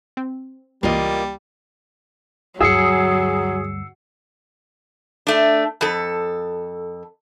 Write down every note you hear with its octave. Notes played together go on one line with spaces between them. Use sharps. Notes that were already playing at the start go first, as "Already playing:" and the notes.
C4
C#2 E3 G3 A#3 F4 D#5
D2 G2 F#3 G#4 E6 C7 C#7
A3 D4
F2 A4